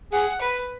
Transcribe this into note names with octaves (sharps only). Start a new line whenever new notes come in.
G#4 F#5
B4